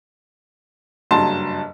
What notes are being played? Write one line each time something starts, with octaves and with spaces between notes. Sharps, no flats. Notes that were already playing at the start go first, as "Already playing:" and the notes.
F#1 G2 F#3 A5 C6